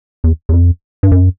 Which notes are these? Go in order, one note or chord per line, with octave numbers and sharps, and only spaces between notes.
E2
E2
F2
G2
F#2